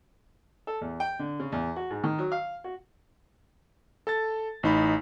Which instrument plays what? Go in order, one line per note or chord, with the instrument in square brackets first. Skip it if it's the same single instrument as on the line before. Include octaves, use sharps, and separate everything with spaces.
[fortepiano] A4
E2
G5
D3
C#3
E2
F#4
G#2
D#3
F#3
F5
F#4
[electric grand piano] A4 A5 A6
A1 D#4 B5